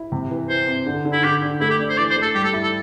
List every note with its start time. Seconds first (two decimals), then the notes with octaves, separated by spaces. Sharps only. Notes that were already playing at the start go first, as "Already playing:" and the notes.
Already playing: E4
0.12 C3
0.31 E3
0.49 E3 C5
0.68 C4
0.86 D3
1.05 D3
1.12 E4
1.24 D3 G4
1.42 D3
1.60 A3 E4
1.70 G4
1.79 D4
1.89 C5
1.97 E3 D5
2.10 C5
2.16 A3
2.22 A4
2.35 G3 G4
2.44 A4
2.53 E4
2.63 A4